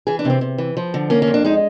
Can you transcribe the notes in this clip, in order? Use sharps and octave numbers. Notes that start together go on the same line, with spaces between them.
E3 G#4
D4
C3 C4
C3
E3
F3
D3
A#3 C#4
C#4
F2
D4
G#3 D#4